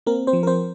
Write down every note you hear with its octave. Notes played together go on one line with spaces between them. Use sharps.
A#3 C4 A#4
C4 C5
F3
A#4
C4 C5